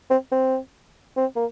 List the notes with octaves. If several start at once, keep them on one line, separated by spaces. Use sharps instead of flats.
C4
C4
C4
A#3